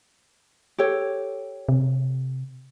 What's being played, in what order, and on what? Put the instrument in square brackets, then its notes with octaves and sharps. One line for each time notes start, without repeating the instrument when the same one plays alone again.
[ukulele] G4 A4 C#5
[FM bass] C3